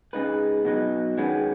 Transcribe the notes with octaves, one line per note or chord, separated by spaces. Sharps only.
C#3 G#3 D#4 B4
B2 F#3 D#4 B4
D#3 G#3 C#4 F#4 B4